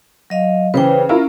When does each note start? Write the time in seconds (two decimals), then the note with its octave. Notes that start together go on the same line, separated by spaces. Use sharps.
0.30 F#3 D#5 F5
0.74 C#3 E3 B4 C5 G5
1.09 C#4 E4 F4 A#4